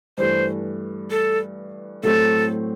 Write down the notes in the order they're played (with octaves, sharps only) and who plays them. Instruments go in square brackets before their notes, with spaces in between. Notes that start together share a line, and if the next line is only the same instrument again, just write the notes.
[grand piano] G2 E3 A3 [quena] C5
[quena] A4
[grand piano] A2 F#3 A3 C4 [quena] A4